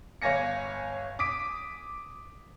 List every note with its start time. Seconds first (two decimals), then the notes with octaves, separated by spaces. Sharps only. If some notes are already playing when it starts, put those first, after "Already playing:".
0.22 G1 C#5 F5 G#5 A#6 C#7
1.19 D6 D#6 B6 D7